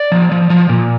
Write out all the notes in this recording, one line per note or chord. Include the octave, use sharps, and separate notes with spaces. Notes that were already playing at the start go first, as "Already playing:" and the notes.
Already playing: D5
F3
F3
F3
A#2